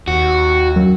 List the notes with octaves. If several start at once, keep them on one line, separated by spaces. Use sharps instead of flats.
D#2 F#4
F#2